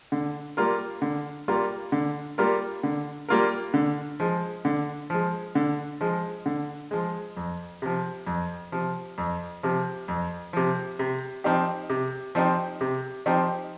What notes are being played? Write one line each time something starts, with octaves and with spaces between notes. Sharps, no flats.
D3
G3 A#3 F4 A#4
D3
G3 A#3 F4 A#4
D3
G3 A#3 F4 A#4
D3
G3 A#3 F4 A#4
D3
F3 G#3
D3
F3 G#3
D3
F3 G#3
D3
F3 G#3
F2
C3 F3
F2
C3 F3
F2
C3 F3
F2
C3 F3
C3
F3 C4 D#4 G4
C3
F3 C4 D#4 G4
C3
F3 C4 D#4 G4